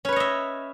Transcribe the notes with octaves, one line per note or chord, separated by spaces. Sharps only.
C#4 B4 C#5 D#5 E5